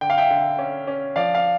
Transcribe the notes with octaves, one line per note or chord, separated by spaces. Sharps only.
D3 G5
F5
E5 G5
D3
C#4
C#4
F3 D5 F5
F5